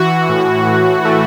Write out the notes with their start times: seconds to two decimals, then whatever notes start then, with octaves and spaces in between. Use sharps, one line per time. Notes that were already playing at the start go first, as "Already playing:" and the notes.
Already playing: E3 F#4
0.29 A2
0.67 A2
1.05 A3